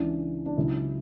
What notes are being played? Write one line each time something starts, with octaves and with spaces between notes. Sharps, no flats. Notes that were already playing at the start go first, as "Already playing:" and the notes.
Already playing: C#2 C#3 E3 D4
D4
C#2 C#3 F#3 E4